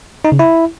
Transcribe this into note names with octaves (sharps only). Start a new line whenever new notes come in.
D#4
C#3
E4